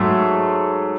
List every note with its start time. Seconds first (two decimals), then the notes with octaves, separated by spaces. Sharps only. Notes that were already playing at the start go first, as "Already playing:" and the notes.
Already playing: G#2 F#3 A3